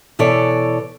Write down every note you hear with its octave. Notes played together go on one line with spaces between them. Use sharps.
B2 E3 A4 C#5 D5